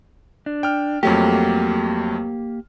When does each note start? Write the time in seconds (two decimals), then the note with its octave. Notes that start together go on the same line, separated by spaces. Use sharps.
0.46 D4
0.63 G5 F6
1.03 F2 F#3 A3 A#3 G4